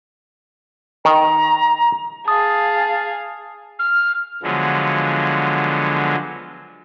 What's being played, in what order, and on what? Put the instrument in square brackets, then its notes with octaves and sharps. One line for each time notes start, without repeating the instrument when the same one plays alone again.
[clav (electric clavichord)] D#3 [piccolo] A#5
[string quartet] G#4 F5 [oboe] A5 [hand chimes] D#6
[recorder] F6
[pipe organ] D3 F3 F#3 G#3 B3